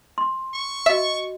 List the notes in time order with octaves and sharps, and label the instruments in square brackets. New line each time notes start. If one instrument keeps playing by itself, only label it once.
[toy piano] C6
[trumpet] C#6
[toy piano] F#4 D#5 [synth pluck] E5